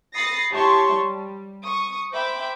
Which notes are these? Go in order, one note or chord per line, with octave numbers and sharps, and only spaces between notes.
B5 D#6 A6 A#6 C7 C#7
E4 G4 C#5 A5 C6 C#6
G3
C#6 D#6
C5 E5 G5 B5 D6